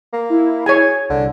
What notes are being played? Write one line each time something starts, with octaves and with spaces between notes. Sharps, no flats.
A#3
E4
G#4 C#5 G#5
C2 D3